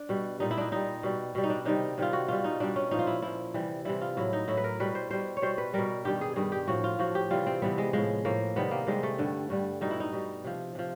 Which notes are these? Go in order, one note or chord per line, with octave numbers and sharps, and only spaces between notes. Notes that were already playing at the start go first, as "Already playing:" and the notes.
Already playing: D4
B2 G3
A#2 G3 D#4
E4
D4 D#4
A#2 G3 D#4
B2 G3
B2 G3
D#4
D4
C3 D#3 G3 D#4
C3 D#3 G3 F4
F#4
B2 G3 F4
D#4
B2 G3 D4
C#4
A#2 F3 D#4
F4
E4
A#2 F3 E4
C3 E3 G3
C3 E3 G3 E4
F4
A2 F#3 E4
D#4
A2 F#3 E4
B4
A#4
B2 G3 B4
C5
B2 G3 C5
C#5
B2 G3 C5
B4
B2 G3 A#4
G2 D#3 G3 G4
G#4
G2 D#3 G3 G#4
G4
A2 F3 F#4
F4
A2 F3 F#4
G4
C3 E3 G3 F4
C4
C3 E3 G3 B3
G#3
A2 F3 G#3
A2 F3 A#3
C3 D#3 G3 B3
A#3
C3 D#3 G3 G#3
A3
G2 D3 G3
G2 D3 G3
B2 G3 D#4
E4
D#4
B2 G3
C3 F3
C3 F3